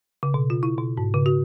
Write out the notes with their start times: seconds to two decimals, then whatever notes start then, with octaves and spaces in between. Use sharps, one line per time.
0.23 C#3
0.34 B2
0.50 F4
0.63 E4
0.78 B2
0.97 G#2
1.14 C#3
1.26 F#4